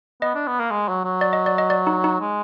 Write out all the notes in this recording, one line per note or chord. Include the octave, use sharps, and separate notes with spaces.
B3 D#5
D4
B3
A#3
G#3
F#3
F#3
D5
D#5
D5
D#5
D5
D#4
D#4
G#3